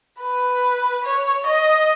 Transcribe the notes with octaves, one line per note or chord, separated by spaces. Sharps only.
B4
C#5
D#5